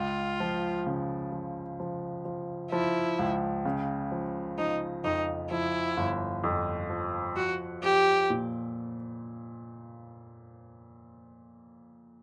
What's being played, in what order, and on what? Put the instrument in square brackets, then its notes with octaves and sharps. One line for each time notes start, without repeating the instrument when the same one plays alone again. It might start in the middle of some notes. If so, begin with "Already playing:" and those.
Already playing: [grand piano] C#2 [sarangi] F4
[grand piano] F3
C#3
F3
F3
F3
[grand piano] F3 [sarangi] E4
[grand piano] C#2
C#3
F3
[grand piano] F3 [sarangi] D#4
[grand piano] F2 [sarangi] D#4
[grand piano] F3 [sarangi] E4
[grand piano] G1
F2
F3
[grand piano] F3 [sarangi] F#4
[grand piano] F3 [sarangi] G4
[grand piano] A#2